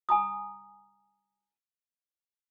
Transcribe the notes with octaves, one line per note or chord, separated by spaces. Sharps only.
G#5 A#5 D#6